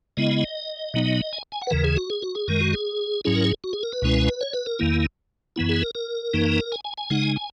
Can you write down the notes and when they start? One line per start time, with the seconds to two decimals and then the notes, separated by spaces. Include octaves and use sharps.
0.17 C#3 G#3 B3 E4 D#5
0.94 B2 F#3 B3 D#4
1.33 G#5
1.52 G#5
1.61 F#5
1.67 B4
1.71 D#2 C#3 E3 A#4
1.84 G#4
1.96 F#4
2.10 G#4
2.22 F#4
2.35 G#4
2.48 F#2 D#3 G#3 A#4
2.61 F#4
2.73 G#4
3.25 G#2 F#3 C#4 E4 G#4
3.35 A#4
3.44 G#4
3.64 F#4
3.73 G#4
3.83 A#4
3.92 B4
4.02 C#2 B2 G#3 C#4 E4
4.41 C#5
4.53 B4
4.66 A#4
4.79 E2 D#3 A#3 E4
5.56 F#2 E3 B3 E4
5.69 G#4
5.82 A#4
5.95 A#4
6.33 F#2 E3 A#3 D#4
6.72 G#5
6.85 G#5
6.98 G#5
7.10 C#3 G#3 D#4 F#5
7.23 G#5
7.36 G#5